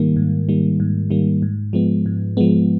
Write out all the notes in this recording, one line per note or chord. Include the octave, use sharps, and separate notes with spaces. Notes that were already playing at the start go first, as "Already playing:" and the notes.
Already playing: G#2 D#3 G3 A#3
G#2
D#3 G3 A#3
G#2
D#3 G3 A#3
G#2
F3 G#3 B3
G#2
F3 G#3 B3